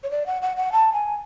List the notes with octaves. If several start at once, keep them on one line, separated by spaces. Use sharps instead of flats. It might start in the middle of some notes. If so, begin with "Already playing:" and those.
C#5
D5
F#5
F#5
F#5
A5
G#5